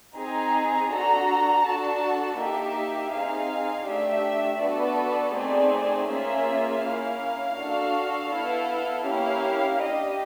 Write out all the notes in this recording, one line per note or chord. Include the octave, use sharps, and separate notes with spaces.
C4 D#4 G#4 A#5
D4 F#4 A4 A#5
D4 F#4 A4 A5
A#3 D#4 G4 E5
C4 D#4 G#4 F5
A3 D4 G4 E5
B3 D4 F#4 A4 D5
A3 C4 D#4 G#4 D5
D5
A#3 C#4 F4 G#4 E5
A#3 C#4 E4 F5
D4 F#4 A4
B3 E4 A4
A#3 C#4 E4 G4 F5
D4 G4 D#5